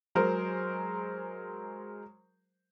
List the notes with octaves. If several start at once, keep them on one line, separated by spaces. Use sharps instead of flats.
F#3 G#3 A#4 C5